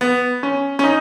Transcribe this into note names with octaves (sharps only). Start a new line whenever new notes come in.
B3
C#4
C#4
D#4